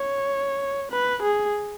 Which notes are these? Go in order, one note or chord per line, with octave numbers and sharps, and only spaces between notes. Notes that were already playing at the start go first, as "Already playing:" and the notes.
Already playing: C#5
B4
G#4